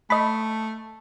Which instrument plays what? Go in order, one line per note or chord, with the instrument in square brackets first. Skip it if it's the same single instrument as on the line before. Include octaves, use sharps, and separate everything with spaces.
[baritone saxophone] A3 [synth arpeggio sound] D#5 B5